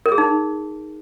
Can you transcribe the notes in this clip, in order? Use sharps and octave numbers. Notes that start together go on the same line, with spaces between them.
A#4
G#4
D#4